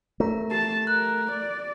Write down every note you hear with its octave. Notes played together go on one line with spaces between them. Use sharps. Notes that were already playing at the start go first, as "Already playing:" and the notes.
A3 A#4 A#5
G4 A5
A#4 F#6
D5